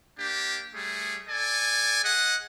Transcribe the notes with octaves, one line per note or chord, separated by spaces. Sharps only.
A#3 D4 G4
G3 A3 G#4
A4 D5 G#5
G#4 D#5 F#5